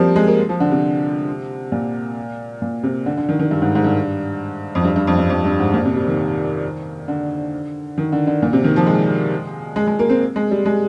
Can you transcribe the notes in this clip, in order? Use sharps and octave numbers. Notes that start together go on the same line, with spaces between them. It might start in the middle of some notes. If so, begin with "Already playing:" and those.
Already playing: F3 G3 A#3 C4
G#3
A#3
F3
D3
C3
A#2
A#2
C3
D3
D3
D#3
D#3
G2
G#2
G#2
G2
F2
G2
G2
F2
G2
F2
G2
G#2
A#2
C3
G3
D#3
D3
D#3
D3
D3
A#2
C3
D#3
F3
G#3
G#3
G#3
A#3
C4
G#3
G3
G#3